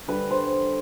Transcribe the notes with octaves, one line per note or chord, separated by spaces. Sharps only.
D3 G3 B4
C5